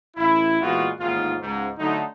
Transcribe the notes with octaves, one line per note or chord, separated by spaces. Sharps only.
A1 E4
A#2 E3 G#3 B3 F4 F#4
A1 D#2 G#2 F4
C#2 G#2
D3 F#3 A3 D#4